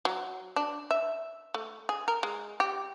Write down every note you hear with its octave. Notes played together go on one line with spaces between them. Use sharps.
F#3
D4
E5
A3
G#4
A#4
G#3
G4